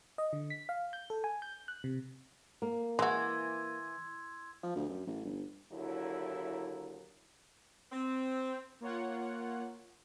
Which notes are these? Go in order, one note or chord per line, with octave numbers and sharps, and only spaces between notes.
D#5
D3
B6
F5
G6
A4
G#5
G6
F#6
C3
A#3
E3 G#3 F#4 C6 E6 G#6
F3
D2
F#2
A1
G1
D#2 D3 F#3 E4
C4
A#3 F4 C#5 F#5